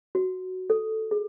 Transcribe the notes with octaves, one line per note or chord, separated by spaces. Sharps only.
F#4
A4
G#4